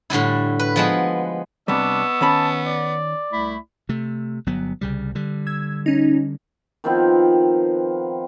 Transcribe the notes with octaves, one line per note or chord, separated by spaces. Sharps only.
A2 D3 G3 E4
B4
F3 G#3 B3
C3 G3 B3 D4 D#5 C#6 E6
D#3 C#4 A5 B5
D5
C2 A3 E4 B5
C3 A3
G1 F#3 B3
C2 C#3 G3
D3 G3
E6 G#6
C#4 D#4
D#3 F3 B3 C4